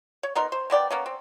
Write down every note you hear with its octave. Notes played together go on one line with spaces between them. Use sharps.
C#5
B3 D#4 A#4 C6
C5
D#3 B3 D5 G5
A#3 B3 C#4
C4